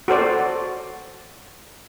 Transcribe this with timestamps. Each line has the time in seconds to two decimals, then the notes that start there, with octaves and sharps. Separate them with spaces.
0.08 F#4 A4 C5 D5